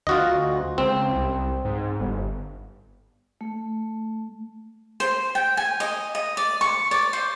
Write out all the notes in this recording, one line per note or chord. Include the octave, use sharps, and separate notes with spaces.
D2 F4 F#4 D#5
C#2 C4
C2
G#2
G1
A3
C5
G5
G#5
D#5
D#5
D5
C#6
D5
C5